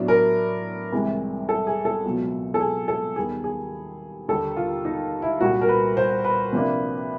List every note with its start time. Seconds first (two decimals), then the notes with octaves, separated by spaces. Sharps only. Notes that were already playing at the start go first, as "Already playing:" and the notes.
Already playing: A2 F#3 B3 D4
0.08 A#4
0.92 C2 C3 E3 G#3
1.49 A4
1.67 G#4
1.85 A4
2.04 C#2 B2 F#3
2.54 A4
2.61 G#4
2.88 A4
3.16 D#2 D#3 G3 B3 G#4
3.44 G#4
4.28 D#2 D3 G3 A4
4.57 F4
4.85 D#4
5.22 E4
5.40 C2 A#2 G3 F#4
5.62 A#4
5.69 B4
5.97 C5
6.24 B4
6.53 C3 F3 A#3 D4